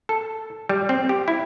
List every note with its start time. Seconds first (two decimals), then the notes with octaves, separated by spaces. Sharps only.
0.09 A4
0.69 G3
0.89 C4
1.09 G4
1.28 E4